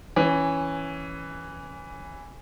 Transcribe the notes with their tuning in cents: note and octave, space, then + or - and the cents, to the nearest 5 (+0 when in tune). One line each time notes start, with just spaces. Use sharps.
E3 +0 C#4 +0